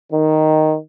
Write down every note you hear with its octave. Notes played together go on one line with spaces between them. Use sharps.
D#3